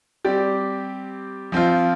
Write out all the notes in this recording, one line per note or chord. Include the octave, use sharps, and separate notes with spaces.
G3 C4 G4 D5
F3 C4 F4